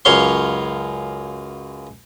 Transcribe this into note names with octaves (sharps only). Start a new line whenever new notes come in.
C#2 F#2 C#5 F5 C6